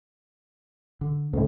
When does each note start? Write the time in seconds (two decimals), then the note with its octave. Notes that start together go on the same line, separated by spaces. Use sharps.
1.01 D3
1.33 D2 A2 C#3